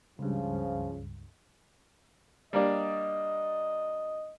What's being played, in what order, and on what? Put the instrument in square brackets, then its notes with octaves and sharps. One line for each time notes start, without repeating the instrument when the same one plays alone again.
[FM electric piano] C#2 G2 [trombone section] C#3 F3
[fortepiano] G3 A#3 D4 [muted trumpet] D#5